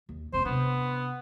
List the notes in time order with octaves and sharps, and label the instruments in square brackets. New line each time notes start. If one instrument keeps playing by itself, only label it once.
[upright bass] D#2
[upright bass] E1 C4 [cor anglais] C5
[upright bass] C3 D4 [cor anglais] B3